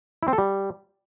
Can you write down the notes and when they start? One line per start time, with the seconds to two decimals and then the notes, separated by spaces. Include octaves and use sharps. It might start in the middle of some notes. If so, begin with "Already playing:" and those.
0.23 E4
0.28 C4
0.33 A4
0.38 G3